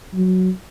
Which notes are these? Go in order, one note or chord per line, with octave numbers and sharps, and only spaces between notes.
F#3